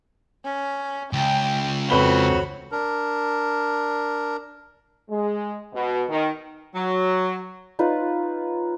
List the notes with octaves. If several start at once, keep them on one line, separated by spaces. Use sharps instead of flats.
C#4
C#2 G5
F2 C4 F#4 B4 C#5 B5 G7
D4 A#4
G#3
B2
D#3
F#3
D#4 F4 B4 C#5